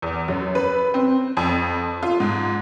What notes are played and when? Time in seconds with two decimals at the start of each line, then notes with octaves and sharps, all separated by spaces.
0.02 E2
0.28 F#2
0.55 B4
0.94 C4
1.37 F2
2.03 F4
2.20 G#2